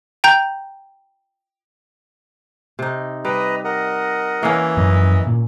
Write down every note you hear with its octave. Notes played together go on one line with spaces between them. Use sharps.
G5 A#5 G6
C3 D#4
G3 B4 D#5 A#5
A#4 D#5 F#5
E3 A#3 C#4
F#2 F3 F#3 D#5
A#2